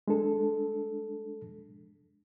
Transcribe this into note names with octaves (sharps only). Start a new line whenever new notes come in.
G#3 D4 A4